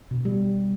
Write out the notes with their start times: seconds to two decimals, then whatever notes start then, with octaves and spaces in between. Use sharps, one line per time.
0.11 B2
0.25 G3